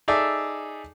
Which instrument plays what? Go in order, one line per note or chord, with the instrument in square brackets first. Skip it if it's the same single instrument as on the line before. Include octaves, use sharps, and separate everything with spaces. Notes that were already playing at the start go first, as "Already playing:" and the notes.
[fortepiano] D#4 G#4 A4 D5 E5